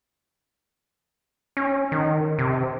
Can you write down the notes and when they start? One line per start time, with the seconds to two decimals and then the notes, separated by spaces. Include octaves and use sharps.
1.57 C#4
1.92 D#3
2.39 C3